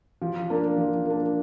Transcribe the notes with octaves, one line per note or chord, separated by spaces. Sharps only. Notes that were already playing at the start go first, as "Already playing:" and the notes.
F3
A#3 D4
F3
A#3 D4